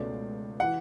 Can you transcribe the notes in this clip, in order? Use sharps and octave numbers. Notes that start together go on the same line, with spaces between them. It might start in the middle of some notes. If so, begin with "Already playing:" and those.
Already playing: C#2 B2 A3 C#4 D5
E3 F#5